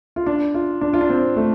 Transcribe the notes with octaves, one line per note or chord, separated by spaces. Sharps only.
F4
D4
F4
D4
F4
D4
C4
A3